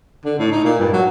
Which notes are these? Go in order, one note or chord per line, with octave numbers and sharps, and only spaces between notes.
D3
A2
D#4
A#2
G2
F#3